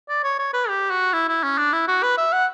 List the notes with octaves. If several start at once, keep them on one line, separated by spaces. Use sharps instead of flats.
D5
C#5
C#5
B4
G4
F#4
E4
E4
C#4
D4
E4
F#4
B4
E5
F#5